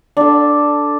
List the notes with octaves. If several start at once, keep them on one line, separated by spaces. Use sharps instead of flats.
D4 A4